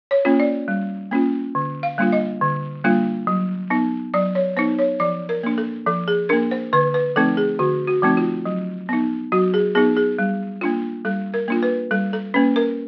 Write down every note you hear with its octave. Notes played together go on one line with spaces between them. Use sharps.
C#5
A#3 C#4 F4
D5
G3
A#3 C#4 F4
D3
F5
G3 A#3 D4 F4
D#5
D3
G3 A#3 D4 F4
F#3
B3 D#4
F#3 D5
C#5
B3 D#4 C5
C#5
F3 D5
A#4
A#3 D4
A4
F3 A4
G#4
A#3 D4 A#4
C5
D3 B4
B4
F3 A3 C4 D#4 A4
G#4
D3 F#4
F#4
F3 A3 C4 D#4
F4
F#3
B3 D#4
F#3 F#4
G#4
B3 D#4 G#4
G#4
G3
A#3 D4 F4
G3 A4
A#4
A#3 D4 F4
B4
G3 A4
A4
A#3 C#4 B4
A#4